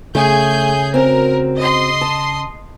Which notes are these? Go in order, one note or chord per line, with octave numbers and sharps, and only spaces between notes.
C#3 A3 G#4 G#5 G6
C4 F#4 A#4
D#5 C6
A5